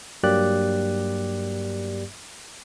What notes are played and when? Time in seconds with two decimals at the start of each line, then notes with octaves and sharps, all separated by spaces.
0.23 G2 F#3 A#3 G4 D5 F#6